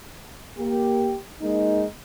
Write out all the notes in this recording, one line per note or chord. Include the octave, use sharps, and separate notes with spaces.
A#3 G4
G#3 A#3 D#4